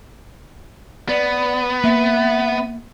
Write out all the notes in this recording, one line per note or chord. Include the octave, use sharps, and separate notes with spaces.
B3 D5
A#3 E5